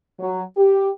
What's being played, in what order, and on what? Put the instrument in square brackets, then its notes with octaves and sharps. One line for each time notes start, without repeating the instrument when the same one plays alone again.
[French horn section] F#3
G4